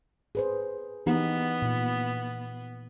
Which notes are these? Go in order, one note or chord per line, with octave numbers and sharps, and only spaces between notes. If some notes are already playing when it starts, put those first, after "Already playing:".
G#4 B4 C5
E3 B3 D#4 G4
A#2